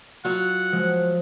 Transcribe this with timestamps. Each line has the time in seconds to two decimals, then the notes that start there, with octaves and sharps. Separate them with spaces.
0.25 F#3 F4 F#5
0.72 F3 G#3